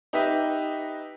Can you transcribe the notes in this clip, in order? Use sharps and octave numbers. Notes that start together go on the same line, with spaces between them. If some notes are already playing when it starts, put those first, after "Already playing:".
D#4 G4 B4 D#5 E5